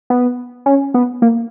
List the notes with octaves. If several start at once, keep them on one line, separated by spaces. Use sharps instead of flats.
B3
C#4
B3
A#3